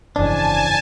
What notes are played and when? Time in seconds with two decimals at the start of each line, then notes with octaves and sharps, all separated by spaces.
0.16 G1 F2 C#3 E3 D4 F4 G#5 A5